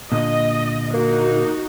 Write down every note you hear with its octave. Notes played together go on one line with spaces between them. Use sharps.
A#2 D3 D#5
A#3 D#4 F#4